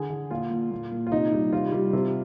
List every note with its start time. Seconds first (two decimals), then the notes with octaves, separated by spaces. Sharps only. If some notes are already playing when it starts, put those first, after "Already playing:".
Already playing: D3 G#4
0.10 D3
0.31 A#2 F4
0.51 A#2
0.71 A#2
0.92 A#2
1.07 F4
1.12 C3 D#4
1.33 G3
1.53 C3 F4
1.72 G3
1.93 C3